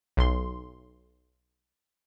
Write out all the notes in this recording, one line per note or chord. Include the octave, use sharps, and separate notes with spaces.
B1 C6